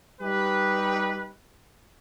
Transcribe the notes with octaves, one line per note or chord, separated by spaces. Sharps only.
G3 D#4 G4 B4